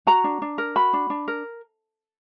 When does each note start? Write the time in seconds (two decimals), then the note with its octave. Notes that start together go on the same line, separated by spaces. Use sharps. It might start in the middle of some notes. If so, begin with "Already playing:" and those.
0.07 F#4 A#5
0.24 D4
0.42 D4
0.58 A#4
0.76 F#4 B5
0.93 D4
1.10 D4
1.28 A#4